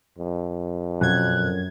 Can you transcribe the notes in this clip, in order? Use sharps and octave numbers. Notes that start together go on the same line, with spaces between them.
F2
F#2 B2 F#6 G#6